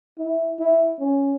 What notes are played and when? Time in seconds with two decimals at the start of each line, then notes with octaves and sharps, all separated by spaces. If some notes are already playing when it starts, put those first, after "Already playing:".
0.18 E4
0.59 E4
1.00 C#4